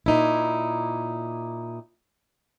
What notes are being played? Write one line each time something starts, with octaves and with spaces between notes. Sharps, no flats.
A#2 D#4 E4